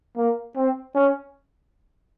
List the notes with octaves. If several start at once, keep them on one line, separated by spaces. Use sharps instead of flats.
A#3
C4
C#4